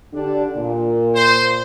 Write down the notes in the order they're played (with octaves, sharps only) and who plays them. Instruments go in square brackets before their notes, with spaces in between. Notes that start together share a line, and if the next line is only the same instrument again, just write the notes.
[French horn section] D3 D4 G4
A#2
[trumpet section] C5